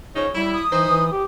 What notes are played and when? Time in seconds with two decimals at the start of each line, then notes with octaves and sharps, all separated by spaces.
0.16 C#3 F3 D#4 C#5
0.35 G3 E4
0.52 D#6
0.72 E3 D#4 B4 C5
0.89 E3
1.12 G4